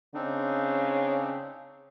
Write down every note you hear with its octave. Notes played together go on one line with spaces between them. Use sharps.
C#3 C4 D4 D#4